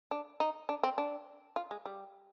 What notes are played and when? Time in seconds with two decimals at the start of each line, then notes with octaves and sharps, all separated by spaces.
0.11 D4
0.40 D#4
0.69 D4
0.83 C4
0.98 D4
1.56 F4
1.71 G#3
1.85 G3